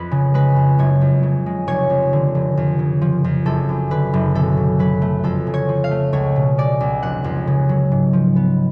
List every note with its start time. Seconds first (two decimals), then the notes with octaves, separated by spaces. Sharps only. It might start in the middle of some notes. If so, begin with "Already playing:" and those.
Already playing: F2 B4
0.11 C#3
0.34 G#3 B4
0.56 F2
0.79 F#1 C#5
1.01 F2
1.23 C#3
1.46 G#3
1.67 F1 C#5
1.90 F2
2.13 D3
2.35 F1
2.57 F2
2.79 C#3
3.01 F3
3.24 F2
3.46 F#1 A4
3.69 F#2
3.91 D3 B4
4.13 F#1
4.35 B1 A4
4.57 B2
4.79 F#3 B4
5.02 A3
5.24 F2 A4
5.47 C#3
5.54 C#5
5.69 F3
5.84 F5
5.91 A3
6.13 C#2 C#5
6.36 B2
6.58 G#3 D5
6.80 C#2
7.03 F1 F#5
7.24 F2
7.47 C#3
7.69 F#3
7.92 G#2
8.13 F3
8.36 B3